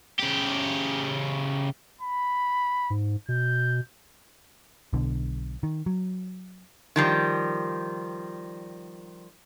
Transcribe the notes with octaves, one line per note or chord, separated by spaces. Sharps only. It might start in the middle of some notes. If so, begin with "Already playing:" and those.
C#3 G4
B5
G#2
B2 G6
B1 B2 D3
D#3
F#3
D#3 F3 G3